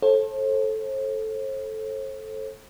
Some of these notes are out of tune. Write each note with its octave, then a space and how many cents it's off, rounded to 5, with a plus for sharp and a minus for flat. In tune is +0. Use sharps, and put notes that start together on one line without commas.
A4 -5 C5 +40